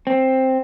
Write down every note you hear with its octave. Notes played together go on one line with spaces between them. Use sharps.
C4